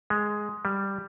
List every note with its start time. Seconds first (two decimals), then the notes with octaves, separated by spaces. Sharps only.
0.10 G#3
0.65 G3